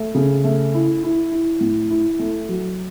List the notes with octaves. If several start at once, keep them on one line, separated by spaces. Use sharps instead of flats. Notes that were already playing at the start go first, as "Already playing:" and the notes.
Already playing: A3
C#3
A3
E4
E4
E4
A2
E4
A3
F#3